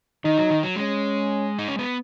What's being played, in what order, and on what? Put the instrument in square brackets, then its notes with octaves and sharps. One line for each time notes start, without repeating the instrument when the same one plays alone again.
[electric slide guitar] D#3 [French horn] D#4
[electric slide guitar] F#3
D#3
F#3
[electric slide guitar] G#3 [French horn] C#4
[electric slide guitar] D#4
C#4
B3